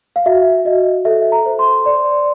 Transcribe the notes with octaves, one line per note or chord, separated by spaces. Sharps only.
F5
F#4 E5
F#4 D#5
A4 E5
A#5
C5
C6
D5